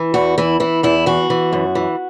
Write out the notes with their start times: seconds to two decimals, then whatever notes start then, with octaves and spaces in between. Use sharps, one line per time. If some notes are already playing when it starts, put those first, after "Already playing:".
Already playing: E3
0.14 E2 F#4
0.38 E3 E4
0.60 E3 E4
0.83 E2 E4
1.06 E3 F#4
1.30 E3
1.53 F#2
1.75 E3